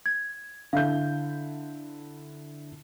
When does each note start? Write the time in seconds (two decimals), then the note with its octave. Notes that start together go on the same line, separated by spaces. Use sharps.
0.06 G#6
0.73 D3 E4 F5 G6